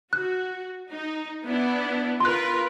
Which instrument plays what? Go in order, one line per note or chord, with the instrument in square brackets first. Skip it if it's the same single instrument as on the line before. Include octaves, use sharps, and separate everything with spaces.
[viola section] F#4 [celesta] F#6
[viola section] D#4
B3 D4 E4
[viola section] F4 A#4 B4 [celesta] C6 F#6